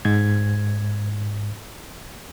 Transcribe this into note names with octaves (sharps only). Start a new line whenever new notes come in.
G#2 G#6